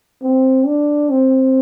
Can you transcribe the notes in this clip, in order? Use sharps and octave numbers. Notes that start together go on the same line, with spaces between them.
C4
D4
C4